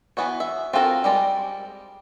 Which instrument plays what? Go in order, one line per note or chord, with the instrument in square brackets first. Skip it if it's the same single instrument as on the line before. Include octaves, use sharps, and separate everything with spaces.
[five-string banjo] E3 B3 F#4 C#5
E5
C4 F4 F#4 A4 A#4
G3 G#3 D5